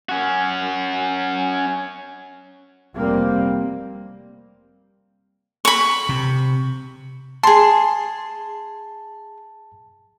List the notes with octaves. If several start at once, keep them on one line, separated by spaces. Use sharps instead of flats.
C#4 F#4
F1 G3 A#3 C4
B5 C#6
C3
G#4 A5 C6